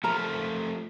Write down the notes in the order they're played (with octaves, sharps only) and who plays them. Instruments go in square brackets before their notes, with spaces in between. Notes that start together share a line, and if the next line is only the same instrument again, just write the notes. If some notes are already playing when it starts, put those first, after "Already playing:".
[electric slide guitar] F3 A3 [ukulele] A#4 A#5